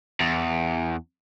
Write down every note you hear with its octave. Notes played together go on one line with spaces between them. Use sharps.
E2